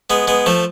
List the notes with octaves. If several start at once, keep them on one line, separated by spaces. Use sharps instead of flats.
G#3 B3
G#3 B3
F3 A3